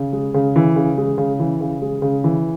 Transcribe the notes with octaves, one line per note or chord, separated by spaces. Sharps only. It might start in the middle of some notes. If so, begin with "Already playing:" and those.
Already playing: C#3
G#3
C#3
E3
C#3
G#3
C#3
E3
C#3
G#3
C#3
E3